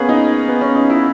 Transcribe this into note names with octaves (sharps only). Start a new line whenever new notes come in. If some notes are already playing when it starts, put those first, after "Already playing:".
Already playing: A#3 B3 C#4 G#4
D#4
B3
C#4
D#4
E4